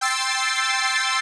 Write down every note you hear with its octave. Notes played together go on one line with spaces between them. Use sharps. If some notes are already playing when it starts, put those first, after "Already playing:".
G5 C6 E6 A6 C7